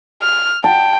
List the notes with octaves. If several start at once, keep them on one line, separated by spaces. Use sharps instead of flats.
F6
G5 A5